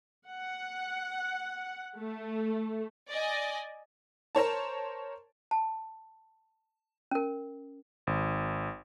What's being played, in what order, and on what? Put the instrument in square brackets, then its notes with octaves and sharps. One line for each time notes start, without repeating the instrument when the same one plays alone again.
[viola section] F#5
A3
[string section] D5 D#5 G#5
[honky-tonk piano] A#4 C5 C#5 A5
[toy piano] A5
C#4 A#4
[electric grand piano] G#1